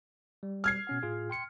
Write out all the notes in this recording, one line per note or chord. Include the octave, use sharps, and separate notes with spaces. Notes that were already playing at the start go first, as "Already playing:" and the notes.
G3
F6 G#6 C7
B2 C#4 F#5
A2 F4 G#4
G5 C6 C#7